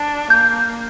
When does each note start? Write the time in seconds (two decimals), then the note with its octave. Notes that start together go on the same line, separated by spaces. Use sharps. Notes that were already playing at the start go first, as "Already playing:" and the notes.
Already playing: D4
0.30 A#3 G6